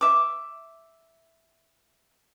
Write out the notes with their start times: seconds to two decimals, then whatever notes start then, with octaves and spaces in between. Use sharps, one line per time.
0.01 E5 D6